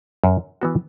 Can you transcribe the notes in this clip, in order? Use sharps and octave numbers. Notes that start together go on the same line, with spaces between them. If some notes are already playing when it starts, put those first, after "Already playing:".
F#2
E3 B3 F#4